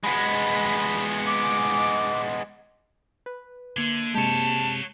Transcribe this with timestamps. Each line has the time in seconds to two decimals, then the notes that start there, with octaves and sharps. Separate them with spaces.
0.04 G#3 B3 B5
1.26 D6
3.26 B4
3.77 D3 A#3 G#6
4.14 C3 G#3 G4 C#5 A5